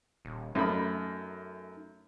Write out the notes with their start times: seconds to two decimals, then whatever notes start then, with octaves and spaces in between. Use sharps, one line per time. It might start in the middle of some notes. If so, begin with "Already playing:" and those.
0.25 D#1
0.55 F#2 A3 D#4 B5